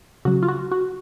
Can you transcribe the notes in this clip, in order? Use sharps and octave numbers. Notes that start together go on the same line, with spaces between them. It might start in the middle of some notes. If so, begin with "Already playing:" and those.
C#3 F#3 F#4
F4
F#4
F#4